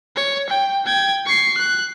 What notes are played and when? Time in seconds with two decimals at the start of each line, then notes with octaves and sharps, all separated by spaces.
0.16 C#5
0.49 G5
0.85 G5 G#6
1.26 C#6 C7
1.57 F#6